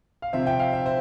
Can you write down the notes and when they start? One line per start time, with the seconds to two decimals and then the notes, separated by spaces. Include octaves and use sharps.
0.22 F5
0.33 C3 F3 C4 E5
0.47 G5
0.59 F5
0.73 E5
0.86 C5